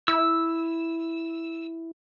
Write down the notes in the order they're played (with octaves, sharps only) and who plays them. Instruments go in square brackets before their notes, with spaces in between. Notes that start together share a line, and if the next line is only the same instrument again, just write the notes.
[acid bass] E4 [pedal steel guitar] E6